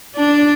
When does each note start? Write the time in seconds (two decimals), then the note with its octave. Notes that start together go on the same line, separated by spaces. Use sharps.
0.16 D4